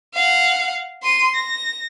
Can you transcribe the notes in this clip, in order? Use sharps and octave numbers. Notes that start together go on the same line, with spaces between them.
F5 F#5
C6 D#7
A#6